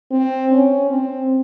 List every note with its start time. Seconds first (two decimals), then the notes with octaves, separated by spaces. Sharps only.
0.11 C4
0.52 C#4
0.90 C4